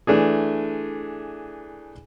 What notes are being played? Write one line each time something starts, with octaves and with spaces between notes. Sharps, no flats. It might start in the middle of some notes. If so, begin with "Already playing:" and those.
E3 A3 D4 G#4